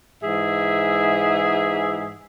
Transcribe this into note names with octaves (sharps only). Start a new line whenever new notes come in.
G#2 E3 G#4 E5